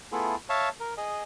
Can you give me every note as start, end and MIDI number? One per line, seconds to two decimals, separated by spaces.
0.12 0.36 57
0.12 0.36 59
0.12 0.36 64
0.12 0.36 65
0.12 0.36 68
0.12 0.36 69
0.49 0.69 73
0.49 0.69 76
0.49 0.69 77
0.49 0.69 81
0.80 0.94 70
0.97 1.23 68
0.97 1.23 75